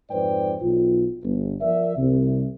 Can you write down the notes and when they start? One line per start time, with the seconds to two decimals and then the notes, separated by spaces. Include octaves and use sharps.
0.10 F2 G#2 B4 C5 D5 G5
0.62 B1 F4
1.24 G1
1.61 F3 A#4 D5 E5
1.96 C2 C3